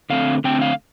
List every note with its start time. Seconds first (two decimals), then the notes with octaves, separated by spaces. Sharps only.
0.10 D3 A3 C4 F5
0.44 D3 A3 C4 G5
0.61 F5